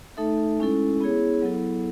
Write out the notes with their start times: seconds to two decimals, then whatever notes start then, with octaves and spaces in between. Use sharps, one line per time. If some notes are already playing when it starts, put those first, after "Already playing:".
0.17 A3 D#4 A4 E5
0.59 G#3 C#4 E4 A4
1.01 B3 E4 G#4 C#5
1.42 F#3 B3 E4 A4